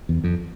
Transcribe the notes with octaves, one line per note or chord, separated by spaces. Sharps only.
E2
F2